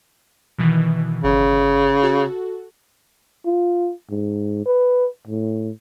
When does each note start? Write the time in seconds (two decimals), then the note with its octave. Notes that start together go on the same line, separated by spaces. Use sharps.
0.58 B2 D#3 E3
1.24 G1 C#3
2.03 F#4 A4
3.46 F4
4.11 G#2
4.66 B4
5.27 A2